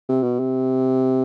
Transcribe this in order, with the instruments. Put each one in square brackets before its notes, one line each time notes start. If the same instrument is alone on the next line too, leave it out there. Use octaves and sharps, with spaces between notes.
[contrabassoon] C3
B2
C3